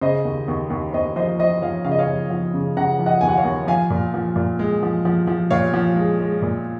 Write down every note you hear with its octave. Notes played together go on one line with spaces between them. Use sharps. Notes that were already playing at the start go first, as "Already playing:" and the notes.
C#3 C5 D#5
D#2
D#2
D#2
D#2 C5 D#5
F3 C5 D#5
F3 C5 D#5
F3 C#5 F5
C#3 F5
D#5
C#5 F5
F3
F3
C#3
C#3 F#5 A#5
F3
D#5 F#5
D#2 G#5
F#5
C#5 F5
D#2
F3 F5 G#5
A#2
F3
A#2
G#3
F3
F3
F3
A#2 C#5 F5
F3
G#3
G#3
A#2